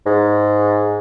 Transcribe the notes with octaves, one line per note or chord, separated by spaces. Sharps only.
G#2